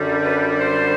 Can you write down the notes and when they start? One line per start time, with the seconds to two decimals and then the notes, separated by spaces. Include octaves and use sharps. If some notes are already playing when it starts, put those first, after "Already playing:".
Already playing: F#2 D3 G3
0.23 B4
0.59 C5